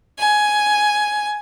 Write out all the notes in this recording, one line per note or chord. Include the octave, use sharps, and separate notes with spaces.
G#5